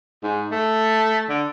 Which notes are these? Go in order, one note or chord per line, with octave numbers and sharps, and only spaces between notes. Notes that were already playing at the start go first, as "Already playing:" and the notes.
G#2
A3
D3